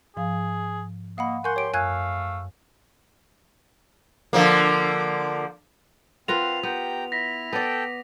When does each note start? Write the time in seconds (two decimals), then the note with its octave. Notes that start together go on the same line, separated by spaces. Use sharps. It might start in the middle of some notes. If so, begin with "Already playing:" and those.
0.17 G#2 F3 G#4 F5
1.18 A#3 D#5 F5 F#5 B5
1.44 A#4 F#5 G#5 C6 C#6 G6
1.56 G4 C#5 D7
1.74 F#2 A3 F5 G#5 F#6 G#6
4.33 D3 F3 A#3
6.28 C4 F4 A#4 B4 F5 F#5 F7
6.63 B3 G4 G5 A#5
7.12 E4 A#6 B6
7.53 B3 A4 D5 G5 A5